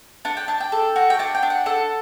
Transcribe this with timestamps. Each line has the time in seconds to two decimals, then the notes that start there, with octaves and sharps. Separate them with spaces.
0.25 D4 F#5
0.37 G5
0.48 D4 A5
0.60 G5
0.72 A4
0.96 F#4
1.10 G5
1.19 D4 F#5
1.35 G5
1.43 D4
1.50 F#5
1.66 A4 F#5